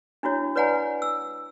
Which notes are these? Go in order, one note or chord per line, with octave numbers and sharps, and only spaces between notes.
D4 E4 F#4 C#5
B4 C#5 D5 F#5 G#5 A#5
E6